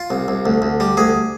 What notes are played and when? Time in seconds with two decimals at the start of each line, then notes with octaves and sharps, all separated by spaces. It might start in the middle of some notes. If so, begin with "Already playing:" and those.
Already playing: F4
0.10 C2
0.28 C2
0.46 D2
0.62 D2
0.80 G3
0.97 D2 G#4